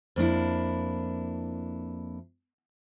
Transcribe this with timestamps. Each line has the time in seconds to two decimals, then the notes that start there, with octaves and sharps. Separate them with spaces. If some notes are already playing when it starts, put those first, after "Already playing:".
0.16 F2 A#3 D4 E4